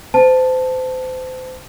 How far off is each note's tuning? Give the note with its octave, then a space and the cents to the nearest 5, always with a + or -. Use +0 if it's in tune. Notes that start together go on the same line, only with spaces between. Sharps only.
C5 -30 A5 +0